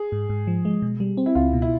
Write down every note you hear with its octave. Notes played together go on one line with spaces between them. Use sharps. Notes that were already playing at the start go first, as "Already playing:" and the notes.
Already playing: G#4
G#2
G#2
F3
G#3
B2
G3
C4
E4
C#2 F4
B2
E4